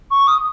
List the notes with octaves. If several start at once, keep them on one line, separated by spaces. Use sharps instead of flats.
C#6
D#6